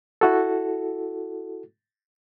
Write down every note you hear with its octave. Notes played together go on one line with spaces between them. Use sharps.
E4 F#4 A4